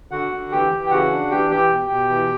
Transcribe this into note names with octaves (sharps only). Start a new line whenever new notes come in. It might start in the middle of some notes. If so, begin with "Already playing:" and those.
D3 F#4 F#5
D3
E3 G4 G5
E3
G5
C#3 F#4 F#5
D4
E3 G4 G5
E3 G4 G5
B2
B2
E3